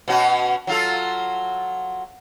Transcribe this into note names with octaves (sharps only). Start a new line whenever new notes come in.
B2 C#4 F#4
F#3 F4 A4